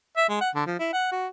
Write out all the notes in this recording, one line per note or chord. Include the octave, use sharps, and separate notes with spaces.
E5
G#3
F#5
D3
F3
E4
F#5
F#4